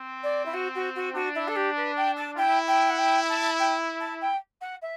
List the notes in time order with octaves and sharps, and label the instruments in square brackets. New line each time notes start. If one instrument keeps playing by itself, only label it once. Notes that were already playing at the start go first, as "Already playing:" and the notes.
Already playing: [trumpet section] C4
[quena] D5
E4
F#4
F#4
F#4
[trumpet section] D4 [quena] F#4
[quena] E4
A4
G4
B4
G5
A5
[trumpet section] E4 [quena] G5
[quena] G5
F#5
G5
A5
G5
A5
G5
F#5
E5